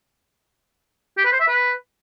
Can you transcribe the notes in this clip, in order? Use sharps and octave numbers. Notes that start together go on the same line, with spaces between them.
G4
B4
C5
E5
B4